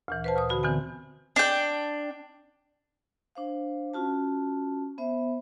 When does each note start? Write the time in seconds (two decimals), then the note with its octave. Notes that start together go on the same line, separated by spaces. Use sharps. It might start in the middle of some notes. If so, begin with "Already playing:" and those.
0.08 D2 A#2 E3
0.24 B4 C5 A5
0.36 D2 A#2 D#6
0.50 D3 F#4 B5
0.63 D3 E3 B3 C4 G#5
1.36 D4 G5
3.35 D4 C5 F5
3.94 C#4 F4 F#4 A5
4.98 B3 C5 E5